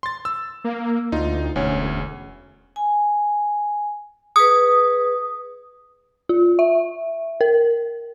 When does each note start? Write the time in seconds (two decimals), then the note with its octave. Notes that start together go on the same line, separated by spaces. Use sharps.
0.03 C6 A6
0.25 E6
0.64 A#3
1.12 D2 D#4 F4
1.56 E1 D2 C#4 C#5
2.76 G#5
4.36 G#4 B4 D#6
6.29 F4
6.59 E5
7.41 A#4